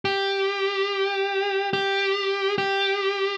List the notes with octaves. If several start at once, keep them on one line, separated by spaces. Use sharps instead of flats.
G4
G4
G4